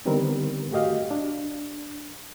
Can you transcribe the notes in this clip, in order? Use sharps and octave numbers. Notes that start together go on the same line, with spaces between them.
D3 D#3 G3 B3 C4 A#4
A3 F#4 G4 D#5 F5
D4